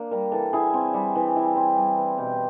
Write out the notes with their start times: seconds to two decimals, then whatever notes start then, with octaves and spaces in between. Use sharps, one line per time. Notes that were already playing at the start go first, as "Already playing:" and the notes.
Already playing: A#3 D4
0.11 G3 A#4
0.32 E3 A4
0.53 E4 G#4
0.74 C4
0.94 G3
1.16 E3
1.36 E4
1.56 C4
1.77 G3
1.98 E3
2.18 B2 G4